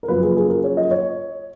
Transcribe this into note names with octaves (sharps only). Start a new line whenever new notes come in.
A#4
F#2 C#3 F3 A#3 F4 B4
G#4
G#4
A#4
C#5
D#5
C#5